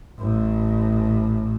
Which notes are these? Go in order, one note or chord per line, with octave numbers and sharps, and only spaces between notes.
A1 A2